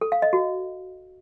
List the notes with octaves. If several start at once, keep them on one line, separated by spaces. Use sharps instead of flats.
A4
F5
D#5
F#4